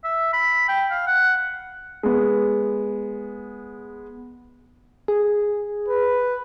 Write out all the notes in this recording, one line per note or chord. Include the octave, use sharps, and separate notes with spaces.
E5
B5
G5
F5
F#5
G#3 B3
G#4
B4